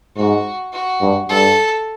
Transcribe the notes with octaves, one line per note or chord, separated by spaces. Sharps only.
G#2 F#4
F#4
G2
G2 A4